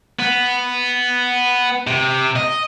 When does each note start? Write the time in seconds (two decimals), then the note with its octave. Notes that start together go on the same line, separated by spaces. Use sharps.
0.19 B3
1.87 C3
2.36 D#5